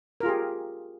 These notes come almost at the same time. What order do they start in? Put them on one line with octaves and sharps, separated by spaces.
A#4 F4 G#4 G4